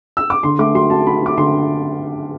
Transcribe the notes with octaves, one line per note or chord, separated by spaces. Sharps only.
E6
D6
D3 C6
A3 D6
F#3 C6
F#3 A5
F#3 B5
F#3 D6
D3 C6